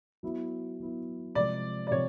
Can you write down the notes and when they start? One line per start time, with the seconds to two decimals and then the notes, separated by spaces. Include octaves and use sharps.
0.23 F#3 B3 E4
0.79 F#3 B3 E4
1.35 C3 F3 G#3 D5
1.87 D5
1.91 C3 F3 C#5